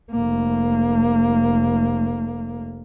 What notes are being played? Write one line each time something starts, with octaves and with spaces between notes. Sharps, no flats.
F1 A#3